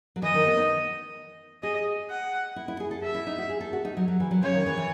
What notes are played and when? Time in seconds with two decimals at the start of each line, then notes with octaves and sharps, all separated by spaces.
0.16 F#3
0.22 E3 D#5
0.34 D#3
0.46 B3
0.57 D#4
1.63 G#4 D#5
2.10 F#5
2.56 E4
2.68 E4
2.80 G#4
2.91 A4
3.03 E5
3.14 E4
3.27 D#4
3.38 F#4
3.49 G#4
3.61 A4
3.73 F#4
3.85 D#4
3.97 F#3
4.08 F#3
4.20 E3
4.31 F#3
4.43 C#3 C#5
4.55 D#3
4.66 E3
4.77 E3